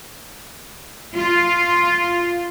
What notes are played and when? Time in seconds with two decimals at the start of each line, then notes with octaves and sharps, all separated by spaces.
1.16 F4